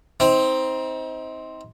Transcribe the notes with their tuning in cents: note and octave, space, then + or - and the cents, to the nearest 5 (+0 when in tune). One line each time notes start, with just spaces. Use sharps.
C4 +0 D#4 +35